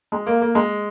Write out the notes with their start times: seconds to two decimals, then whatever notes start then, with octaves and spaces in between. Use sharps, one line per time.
0.12 G#3
0.27 A#3
0.41 A#3
0.55 G#3